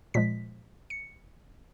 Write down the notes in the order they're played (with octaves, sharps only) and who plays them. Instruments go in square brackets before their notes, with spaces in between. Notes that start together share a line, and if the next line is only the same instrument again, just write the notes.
[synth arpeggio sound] A#2 F3 G#3 B6
C#7